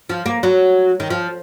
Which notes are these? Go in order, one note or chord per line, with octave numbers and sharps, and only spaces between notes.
F3
A#3
F#3
D#3
F3